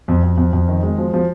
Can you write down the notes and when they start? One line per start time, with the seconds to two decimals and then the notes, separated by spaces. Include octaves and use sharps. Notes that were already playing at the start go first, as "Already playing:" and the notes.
0.08 F2
0.23 F2
0.37 F2
0.53 F2
0.68 D#3
0.83 G#3
0.98 F3
1.14 F3